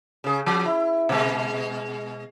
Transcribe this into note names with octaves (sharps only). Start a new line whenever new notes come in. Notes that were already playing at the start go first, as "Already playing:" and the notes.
C#3 G#4
F3
E4
B2 G#3